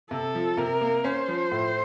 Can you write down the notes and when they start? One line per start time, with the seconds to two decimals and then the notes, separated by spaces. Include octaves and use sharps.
0.11 C3 A4
0.35 F3
0.57 C3 A#4
0.81 A#3
1.05 C#4 C5
1.28 F3
1.51 A2